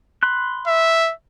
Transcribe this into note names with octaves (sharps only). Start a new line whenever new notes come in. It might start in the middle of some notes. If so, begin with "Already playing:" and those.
B5 C6 F#6
E5